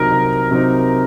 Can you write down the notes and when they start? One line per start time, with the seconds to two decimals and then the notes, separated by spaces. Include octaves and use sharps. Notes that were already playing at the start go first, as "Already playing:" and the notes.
Already playing: C2 C3 F#3 C4 D#4 A#4
0.12 C2
0.51 C3 F#3 C4 D#4